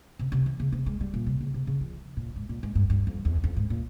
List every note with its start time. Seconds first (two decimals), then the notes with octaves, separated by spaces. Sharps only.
0.19 C3
0.32 C3
0.46 E3
0.60 C#3
0.72 C3
0.86 G#3
1.01 G3
1.14 A#2
1.27 C3
1.41 C#3
1.54 C3
1.67 C#3
1.81 F3
2.17 A#2
2.36 G#2
2.49 A#2
2.63 G#2
2.75 G2
2.90 G2
3.07 F2
3.25 E2
3.44 F2
3.57 G#2
3.70 A#2